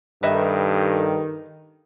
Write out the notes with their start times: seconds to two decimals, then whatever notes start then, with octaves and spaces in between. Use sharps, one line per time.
0.23 G2 D#3 G4 A4 B4 D#5 E5